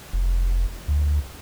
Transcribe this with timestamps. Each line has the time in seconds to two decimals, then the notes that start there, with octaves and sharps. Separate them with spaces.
0.13 F1
0.88 D2